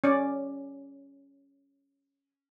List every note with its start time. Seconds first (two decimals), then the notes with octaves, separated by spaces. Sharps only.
0.04 C#4 D5